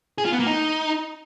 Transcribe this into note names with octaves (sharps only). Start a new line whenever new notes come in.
G#4
F4
B3
A#3
D#4